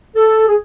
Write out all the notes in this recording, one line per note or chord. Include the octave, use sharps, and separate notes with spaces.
A4
G#4